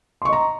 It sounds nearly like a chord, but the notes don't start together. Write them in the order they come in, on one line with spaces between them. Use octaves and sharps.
C6 C#6 D#5 A#5